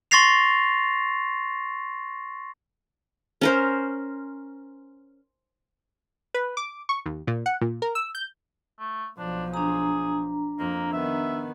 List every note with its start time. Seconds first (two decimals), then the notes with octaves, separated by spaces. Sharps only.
0.11 C6 C#6 A6 A#6 C7 F7
3.41 C#4 A#4 C5
6.34 B4
6.57 D6
6.89 C#6
7.06 D#2
7.27 A#2
7.46 F#5
7.61 A#2
7.82 A#4
7.95 E6
8.15 G6
8.79 A3
9.18 B1 F3 D4
9.54 D4 G#4 A#5
10.59 F2 A#3
10.93 D#3 B3 E5